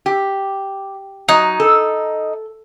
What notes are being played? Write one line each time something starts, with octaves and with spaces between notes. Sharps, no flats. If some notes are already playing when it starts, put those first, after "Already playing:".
G4
F#3 D#4
A4